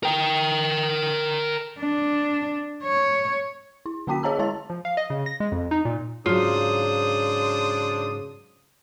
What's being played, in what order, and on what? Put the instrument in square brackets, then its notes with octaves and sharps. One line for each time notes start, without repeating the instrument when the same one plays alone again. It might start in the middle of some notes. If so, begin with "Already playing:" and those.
[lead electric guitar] A#4 G5
[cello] D4
C#5
[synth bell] E4
D3 A#3 C#4 F#4 G5 B6
G#4 C#5 D#5 A5 A#5 E6
G#3 E4 C#5 A5 A6
[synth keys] F3
F5
D#5
C#3
A#6
G#3
F2
D#4
A#2
[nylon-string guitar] G#2 F#3 [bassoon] C#3 [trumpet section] D4 C5 D#6 [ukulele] F4